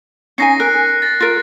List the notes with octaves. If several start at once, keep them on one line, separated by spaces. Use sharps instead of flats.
C#4 D#4 G#5 A#6 C7 C#7
A#4 F#6
A6 A#6
F4 A#4